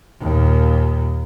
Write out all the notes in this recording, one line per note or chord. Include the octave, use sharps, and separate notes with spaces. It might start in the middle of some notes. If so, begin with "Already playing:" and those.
D#2 A#2